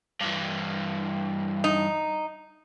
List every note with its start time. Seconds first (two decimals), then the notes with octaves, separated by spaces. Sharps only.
0.21 G2 E3
1.64 D#4